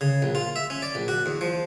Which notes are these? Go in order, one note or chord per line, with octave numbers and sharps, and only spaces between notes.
C#3
A#1
F4
E5
C#4
D5
A#1
F#4
E2
F3